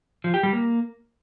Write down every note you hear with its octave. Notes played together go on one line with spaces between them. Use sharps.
F3
G4
G3
A#3